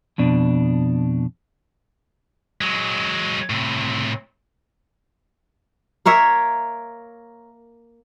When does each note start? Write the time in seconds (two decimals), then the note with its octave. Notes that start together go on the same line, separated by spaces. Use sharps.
0.18 F2 B2 D4
2.61 F#3 G#3
3.50 A2 C3
6.05 A#3 A#4 C#5 E5